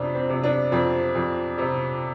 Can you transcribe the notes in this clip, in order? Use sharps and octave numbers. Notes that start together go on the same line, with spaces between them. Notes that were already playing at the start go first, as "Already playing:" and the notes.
Already playing: F2 C3 D4
C4
C3
D4
F2 C4
F2
C3